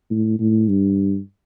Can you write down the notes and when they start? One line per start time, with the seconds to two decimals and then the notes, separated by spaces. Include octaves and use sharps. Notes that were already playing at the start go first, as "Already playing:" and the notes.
0.11 A2
0.39 A2
0.68 G2